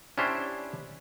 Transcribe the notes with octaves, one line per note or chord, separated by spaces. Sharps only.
C#4 D4 E4 G4 C5